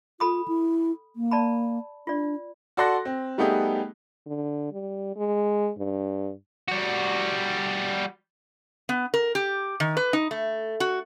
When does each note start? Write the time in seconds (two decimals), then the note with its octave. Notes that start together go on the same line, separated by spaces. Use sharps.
0.20 F4 A4 B5 D#6
0.48 E4
1.16 A#3
1.31 D5 A5 B5
2.07 D4 F4 D5
2.77 F#4 A4 D5 C6 F#6 A#6
3.05 C4
3.38 G3 A3 B3 D#4 G4 G#4
4.26 D3
4.72 G3
5.16 G#3
5.78 G2
6.68 G3 F#4
8.89 B3
9.14 A#4
9.35 G4
9.80 D#3
9.97 B4
10.13 D#4
10.31 A3
10.80 F#4